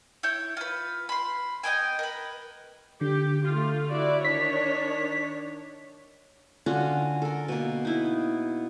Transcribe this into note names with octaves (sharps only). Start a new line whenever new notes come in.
E4 C#5 G6
F4 B4
B5 C6
B3 D#5 G5 G#5
A#4 B4
D3 G4
A3 F4
E4 F#4 D5
D#3 D4 C#5 B6
D3 C#4 F4 F#4
A4 A#4
B2 A#3
D#4 E4